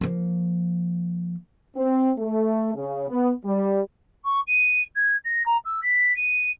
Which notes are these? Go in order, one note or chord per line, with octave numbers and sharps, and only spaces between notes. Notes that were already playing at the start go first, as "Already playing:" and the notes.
F3 A#3
C4
A3
C#3
B3
G3
C#6
D#7
G#6
A#6
A#5
E6
B6
D#7